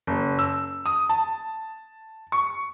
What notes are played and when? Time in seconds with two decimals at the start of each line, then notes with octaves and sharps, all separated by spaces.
0.07 F#1
0.39 E6
0.86 D#6
1.09 A5
2.32 C#6